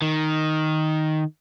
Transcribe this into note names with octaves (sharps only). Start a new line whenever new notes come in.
D#3